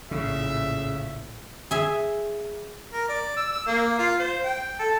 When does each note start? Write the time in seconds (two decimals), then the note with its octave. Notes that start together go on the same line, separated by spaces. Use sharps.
0.11 A#1 A2 C#3 E5
1.71 G#4 E5
2.93 A#4
3.09 D5
3.37 E6
3.53 E6
3.67 A#3
3.99 F4
4.20 C5
4.44 G5
4.79 A4